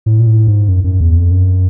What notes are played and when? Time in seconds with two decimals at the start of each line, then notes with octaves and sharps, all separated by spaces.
0.06 A2
0.20 A#2
0.27 A2
0.47 G#2
0.68 F#2
0.84 F#2
1.01 E2
1.16 F2
1.31 F#2